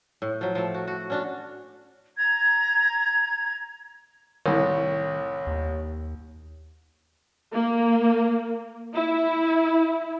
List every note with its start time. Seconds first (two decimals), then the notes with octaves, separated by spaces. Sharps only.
0.22 A2
0.41 F3 F#3
0.55 F3 A3
0.74 F#4
0.87 F#4
1.10 C#4 D4 F#4
2.17 A#5 G#6
4.46 C2 A2 D#3 C#5
5.47 D#2
7.52 A#3
8.93 E4